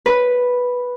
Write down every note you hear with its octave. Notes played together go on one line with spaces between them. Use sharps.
B4